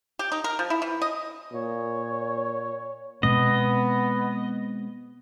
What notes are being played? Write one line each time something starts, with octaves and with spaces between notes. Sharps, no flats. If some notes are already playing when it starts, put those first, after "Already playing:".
G4
D#4
A#4
F3
E4
E3
D#5
A#2 C#5
B2 G#3 B3 C4 D#5